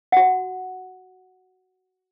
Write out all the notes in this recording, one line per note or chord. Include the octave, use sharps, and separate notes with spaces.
F#4 F#5